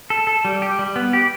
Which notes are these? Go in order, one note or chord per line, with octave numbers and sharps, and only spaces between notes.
A4
A4
G3
G4
G3
B3
G4